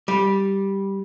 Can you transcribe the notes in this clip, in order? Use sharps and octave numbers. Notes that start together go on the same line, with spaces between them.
G3